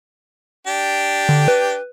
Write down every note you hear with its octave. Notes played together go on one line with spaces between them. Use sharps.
D4 G4
D3
B4